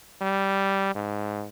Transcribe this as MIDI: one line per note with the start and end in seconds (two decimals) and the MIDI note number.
0.21 0.95 55
0.95 1.47 44